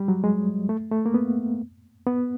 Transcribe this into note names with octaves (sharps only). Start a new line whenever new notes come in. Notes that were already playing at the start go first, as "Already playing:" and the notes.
Already playing: G3
F#3
G#3
A3
A3
A#3
B3
B3